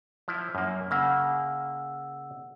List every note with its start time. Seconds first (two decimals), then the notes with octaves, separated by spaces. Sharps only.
0.28 F3 E4
0.55 F#2 A#3
0.91 C#3 A#3 F#5 E6